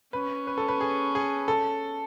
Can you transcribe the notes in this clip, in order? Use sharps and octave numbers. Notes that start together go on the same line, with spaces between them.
C#4 B4
B4
A4
B4
G#4
G#4
A4